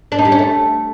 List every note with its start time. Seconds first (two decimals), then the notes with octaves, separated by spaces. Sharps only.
0.12 D4
0.18 D#4
0.25 G3
0.32 C#4
0.39 A3